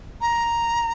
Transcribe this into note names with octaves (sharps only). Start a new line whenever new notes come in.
A#5